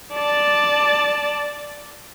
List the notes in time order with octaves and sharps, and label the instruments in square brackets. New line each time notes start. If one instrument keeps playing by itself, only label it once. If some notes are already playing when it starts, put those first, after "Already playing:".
[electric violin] D5 A5